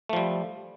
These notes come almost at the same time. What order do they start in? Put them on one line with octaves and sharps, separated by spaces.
A3 F3 G3